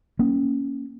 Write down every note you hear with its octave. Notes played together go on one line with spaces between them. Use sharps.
A#3 C#4